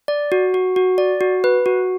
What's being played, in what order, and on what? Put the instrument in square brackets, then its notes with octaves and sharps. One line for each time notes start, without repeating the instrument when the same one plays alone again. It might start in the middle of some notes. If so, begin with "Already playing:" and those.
[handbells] D5
F#4
F#4
F#4
D5
F#4
B4
F#4